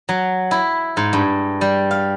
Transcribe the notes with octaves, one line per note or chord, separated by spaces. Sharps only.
F#3
E4
G#2
G2
G3
F5